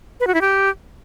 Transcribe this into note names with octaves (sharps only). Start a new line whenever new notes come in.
B4
F#4
E4
G4